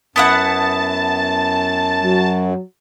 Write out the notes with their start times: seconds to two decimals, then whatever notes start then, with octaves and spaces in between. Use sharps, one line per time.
0.16 F#2 B3 E4 F#5 A5
2.02 F#3